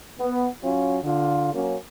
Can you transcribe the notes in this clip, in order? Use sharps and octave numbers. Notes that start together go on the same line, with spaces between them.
B3
F#3 C#4 F4
D3 F4
F#3 A#3 C#4